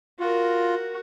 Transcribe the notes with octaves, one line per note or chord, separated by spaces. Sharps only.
F4 F#4 A#4